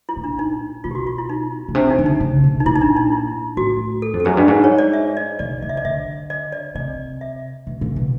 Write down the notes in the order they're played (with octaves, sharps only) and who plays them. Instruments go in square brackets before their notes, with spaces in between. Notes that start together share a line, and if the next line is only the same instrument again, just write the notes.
[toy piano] E4
[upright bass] A#2
[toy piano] D4
D#4
[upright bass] B2 [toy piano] F4
[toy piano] G4
F#4
F4
E4
D#4
[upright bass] B2
[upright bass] C3 [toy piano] D4
[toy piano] D#4
[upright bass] D3
[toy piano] D#4
[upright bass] C#3
B2
[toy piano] D#4
[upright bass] A#2 [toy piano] E4
[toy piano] D#4
D4
D#4
E4
[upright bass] A2 [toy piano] F#4
[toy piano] A4
[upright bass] F2
[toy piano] A4
[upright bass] F#2 [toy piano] G#4
[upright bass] G2
[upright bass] G#2 [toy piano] G#4
[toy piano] C#5
D5
E5
D#5
[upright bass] B2 [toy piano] D5
[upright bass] C3 [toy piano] D#5
[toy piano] E5
D#5
[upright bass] D3 [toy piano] E5
[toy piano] D#5
D5
[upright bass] C3 [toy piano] D#5
[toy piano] E5
[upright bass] B2
A#2
B2